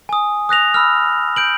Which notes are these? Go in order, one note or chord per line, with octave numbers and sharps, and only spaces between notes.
G#5 D#6
D#6 F#6 A#6 F7
B5 E6 F6
G6 D7 F#7